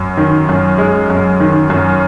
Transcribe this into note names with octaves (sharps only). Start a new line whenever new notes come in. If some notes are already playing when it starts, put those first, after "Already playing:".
Already playing: F#2
D#3
F#2
G#3
F#2
D#3
F#2